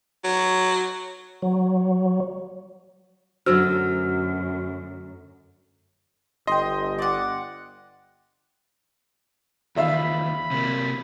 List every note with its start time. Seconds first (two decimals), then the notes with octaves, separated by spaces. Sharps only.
0.24 F#3
1.42 F#3
3.46 F#2 D3 F#3 A3 F#4 C5 E6 F6
6.47 G1 D#5 G5 C6
6.99 D5 F#5
9.76 E2 D#3 F4 E5 F5 B5
10.51 C3 A#3